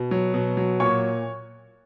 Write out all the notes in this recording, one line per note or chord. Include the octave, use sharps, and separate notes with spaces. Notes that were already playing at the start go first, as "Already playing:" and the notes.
Already playing: B2
F#3
B2
F#3
A#2 C#5 C#6